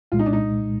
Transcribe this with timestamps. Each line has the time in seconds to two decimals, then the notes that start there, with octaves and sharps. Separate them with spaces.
0.12 C2 A#2 G#3 F4
0.19 D#4
0.26 D4
0.33 D#4